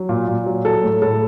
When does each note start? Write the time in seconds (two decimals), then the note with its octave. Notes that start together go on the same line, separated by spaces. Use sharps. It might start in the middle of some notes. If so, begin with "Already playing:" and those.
Already playing: F#3
0.09 A#2
0.28 A#2
0.46 F#3
0.65 F#3 A4
0.83 A2
1.02 A2 A4